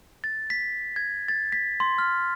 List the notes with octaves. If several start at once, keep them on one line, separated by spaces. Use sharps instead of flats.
A6
B6
G#6
A6
B6
C6
F6